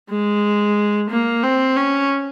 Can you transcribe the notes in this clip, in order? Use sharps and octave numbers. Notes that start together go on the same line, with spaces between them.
G#3
A#3
C4
C#4